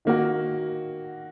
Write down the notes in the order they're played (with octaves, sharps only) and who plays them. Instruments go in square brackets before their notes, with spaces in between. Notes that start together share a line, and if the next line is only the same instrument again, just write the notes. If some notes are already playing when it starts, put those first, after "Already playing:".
[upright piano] D#3 A#3 F#4